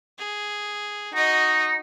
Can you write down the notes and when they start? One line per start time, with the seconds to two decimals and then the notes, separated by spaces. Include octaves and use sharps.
0.19 G#4
1.14 D#4 F#4 D#5